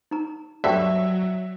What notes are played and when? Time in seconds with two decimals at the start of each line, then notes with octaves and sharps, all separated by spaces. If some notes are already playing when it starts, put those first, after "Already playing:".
0.11 D#4 A#5
0.64 D2 G2 D3 F#3 D5 E5 G5 C#6